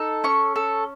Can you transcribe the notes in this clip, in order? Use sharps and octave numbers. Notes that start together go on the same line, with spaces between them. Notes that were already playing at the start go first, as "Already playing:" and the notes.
Already playing: D#4 A4
C#4 C#6
A4